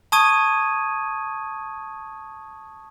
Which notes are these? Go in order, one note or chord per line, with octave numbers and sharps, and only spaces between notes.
A5 C#6 D#6 G#6 D#7